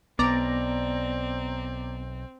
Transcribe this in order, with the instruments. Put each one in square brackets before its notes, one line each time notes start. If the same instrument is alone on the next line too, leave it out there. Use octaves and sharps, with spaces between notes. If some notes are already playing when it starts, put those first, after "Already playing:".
[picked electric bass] B1 [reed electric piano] B3 [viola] C4 [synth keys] D5 A#5